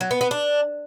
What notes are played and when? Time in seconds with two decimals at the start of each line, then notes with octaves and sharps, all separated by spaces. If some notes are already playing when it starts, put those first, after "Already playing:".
0.01 F#3
0.11 B3
0.21 B3
0.31 D4